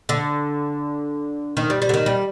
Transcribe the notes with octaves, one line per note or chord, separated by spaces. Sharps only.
D3
D#3
G3
G3
D3
D#3
G3